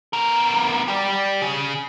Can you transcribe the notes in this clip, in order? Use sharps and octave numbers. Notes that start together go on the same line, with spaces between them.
B3 A#4
G4 D5
C#3